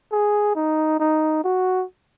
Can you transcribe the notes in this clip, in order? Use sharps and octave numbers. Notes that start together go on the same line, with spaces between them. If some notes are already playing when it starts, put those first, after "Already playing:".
G#4
D#4
D#4
F#4